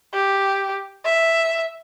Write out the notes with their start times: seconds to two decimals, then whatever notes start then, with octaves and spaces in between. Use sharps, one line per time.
0.14 G4
1.05 E5